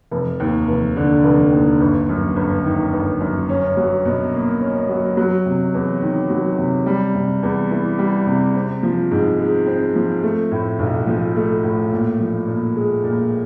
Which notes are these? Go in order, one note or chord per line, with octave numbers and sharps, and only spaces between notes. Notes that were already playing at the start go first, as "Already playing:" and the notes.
F1
D#2
F1
D3
F1
D#2
G1
F#2
G1
D#3
G1
F#2
C#4
F#3
B2
A#3
C#4
F#3
F#3
C3
E2
D#3
F#3
C3
G3
C3
E2
E3
G3
C3
C4
F3
G#2
G#3
C4
F3
A3
A2
B1
F3
A3
A2
A#2
F3
A#2
G#3
A#2